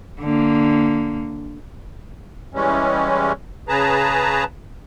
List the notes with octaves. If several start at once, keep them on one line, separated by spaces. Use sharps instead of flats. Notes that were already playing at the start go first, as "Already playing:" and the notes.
D3 A#3
E3 G3 G#3 C#4
C#3 G#4 B4 A5 A#5